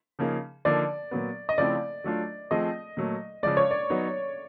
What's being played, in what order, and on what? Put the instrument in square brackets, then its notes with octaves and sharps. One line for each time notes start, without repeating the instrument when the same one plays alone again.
[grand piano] C#3 F3 A#3 D#4 G#4
[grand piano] D3 F3 A#3 D#4 [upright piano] D5
[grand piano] A#2 F#3 B3
[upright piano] D#5
[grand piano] C#3 F3 A3 C4 E4 [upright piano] D5
[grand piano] F#3 A3 D4 F4
[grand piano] F3 A3 C4 F4 G#4 [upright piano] D#5
[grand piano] A#2 F#3 A3
[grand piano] C#3 F3 G#3 [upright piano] D5
[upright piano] C#5
D5
[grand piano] F#3 B3 D#4